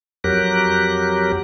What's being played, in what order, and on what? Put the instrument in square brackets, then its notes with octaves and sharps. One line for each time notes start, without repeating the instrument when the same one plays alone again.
[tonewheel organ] F2 F#3 G4 A#4 F#6